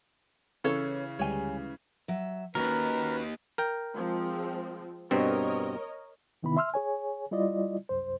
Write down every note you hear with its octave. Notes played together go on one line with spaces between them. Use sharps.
C#3 E3 C#4 A4 C#5
D2 G3 G#3 C#5 G#5
F#3 E5
D#2 C#4 F#4 A#4 B4
A#4 G5
F3 G#3 C4
G2 B2 C4 A#4 C#5 D#5
D2 C3 D#3 B3 E4 B5
E5 C6 E6 F6
G#4 C#5 G#5
G3 E4 F4 D5 D#5
C2 F#2 C5